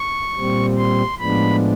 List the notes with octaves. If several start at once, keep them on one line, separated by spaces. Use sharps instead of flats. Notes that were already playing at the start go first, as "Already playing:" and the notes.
Already playing: C#6
A#2 G3 C4
C6
A2 F3 G#3 B3 D4 B5